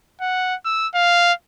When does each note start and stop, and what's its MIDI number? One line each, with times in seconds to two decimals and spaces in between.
0.21 0.55 78
0.65 0.87 88
0.94 1.33 77